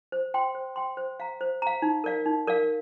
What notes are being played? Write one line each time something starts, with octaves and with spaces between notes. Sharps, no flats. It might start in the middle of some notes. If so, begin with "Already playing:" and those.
C5
G5 C6
C5
G5 C6
C5
F5 A#5
C5
F5 A#5
D#4
A#4 D5 F5
D#4
A#4 D5 F5